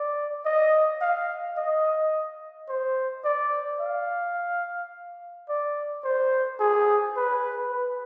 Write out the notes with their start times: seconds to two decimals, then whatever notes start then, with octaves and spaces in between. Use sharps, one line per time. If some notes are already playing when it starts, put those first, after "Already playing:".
Already playing: D5
0.45 D#5
1.01 F5
1.57 D#5
2.69 C5
3.24 D5
3.80 F5
5.49 D5
6.04 C5
6.60 G#4
7.17 B4
7.72 B4